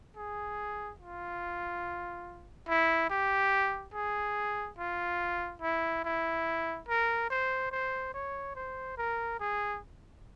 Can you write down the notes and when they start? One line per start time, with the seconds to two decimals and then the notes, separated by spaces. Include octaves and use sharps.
0.16 G#4
1.00 F4
2.68 E4
3.10 G4
3.94 G#4
4.79 F4
5.62 E4
6.04 E4
6.88 A#4
7.30 C5
7.72 C5
8.14 C#5
8.56 C5
8.98 A#4
9.40 G#4